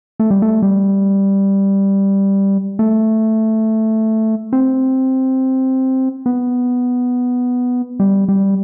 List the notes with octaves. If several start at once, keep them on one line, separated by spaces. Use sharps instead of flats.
A3
G3
A3
G3
A3
C4
B3
G3
G3